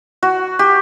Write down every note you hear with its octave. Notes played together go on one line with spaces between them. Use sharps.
F#4
G4